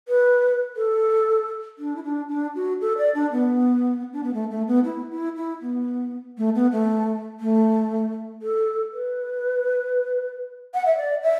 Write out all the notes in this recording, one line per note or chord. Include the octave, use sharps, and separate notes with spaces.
B4
A4
D4
E4
D4
D4
F#4
A4
D5
D4
B3
D4
B3
A3
A3
B3
E4
E4
E4
B3
A3
B3
A3
A3
A4
B4
F#5
E5
D5
E5